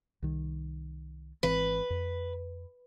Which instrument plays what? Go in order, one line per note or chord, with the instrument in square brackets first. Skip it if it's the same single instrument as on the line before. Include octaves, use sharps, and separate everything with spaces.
[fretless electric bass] C2 D#3
[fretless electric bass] G#1 E3 C4 [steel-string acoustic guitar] B4
[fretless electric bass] F2